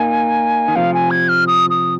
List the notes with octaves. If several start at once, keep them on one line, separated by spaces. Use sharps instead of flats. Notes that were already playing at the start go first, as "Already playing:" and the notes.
Already playing: A#3 D#4 G#5
D#3
C3 F3 F5
G#5
G#6
F6
D#6
D#6